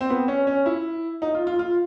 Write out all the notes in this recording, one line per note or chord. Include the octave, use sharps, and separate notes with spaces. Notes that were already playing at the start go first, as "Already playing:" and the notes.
C4
B3
C#4
C#4
E4
D#4
F4
F4
F4